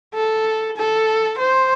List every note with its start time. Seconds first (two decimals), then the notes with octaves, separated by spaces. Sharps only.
0.14 A4
0.76 A4
1.39 C5